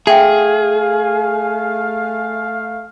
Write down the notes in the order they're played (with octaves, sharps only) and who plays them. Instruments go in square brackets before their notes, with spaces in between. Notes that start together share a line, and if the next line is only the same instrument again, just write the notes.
[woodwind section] A3 F5 [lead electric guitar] G#4 [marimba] E5 G5